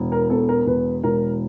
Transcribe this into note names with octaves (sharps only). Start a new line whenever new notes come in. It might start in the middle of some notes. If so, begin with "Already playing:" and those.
Already playing: E1
A#4
E2 A4
A#4
E1 B4
E1 A#4